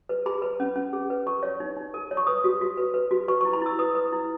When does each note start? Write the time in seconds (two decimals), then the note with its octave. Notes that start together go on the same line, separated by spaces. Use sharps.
0.09 B4
0.26 G#4 B5
0.42 B4
0.60 C#4
0.76 C#4
0.93 G#4
1.10 B4
1.27 A#4 C#6
1.43 C#5
1.60 D#4
1.77 D#4
1.94 A#4
2.11 C#5
2.17 C#6
2.27 B4 D#6
2.44 F#4
2.61 F#4
2.77 B4
2.94 B4
3.11 F#4
3.28 B4 C#6
3.41 C#6
3.45 E4
3.53 B5
3.62 E4 E6
3.79 B4 D#6
3.95 B4
4.12 E4